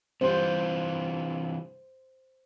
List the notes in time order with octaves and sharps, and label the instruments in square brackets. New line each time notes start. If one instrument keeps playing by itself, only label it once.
[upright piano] G2 G4 C6 [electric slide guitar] C3 E3 F4 [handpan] C5